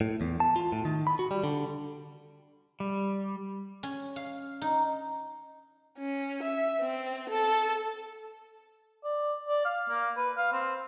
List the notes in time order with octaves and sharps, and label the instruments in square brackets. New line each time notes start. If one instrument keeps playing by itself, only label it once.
[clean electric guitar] A2
E2
A5
F4
A2
D#3
B5
F#4
G3
D3
[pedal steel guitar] G3
[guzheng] C#4
F5
D#4
[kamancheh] C#4
E5
C4
A4 A5
[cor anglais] D5
D5
F5
A#3
B4
F5
C4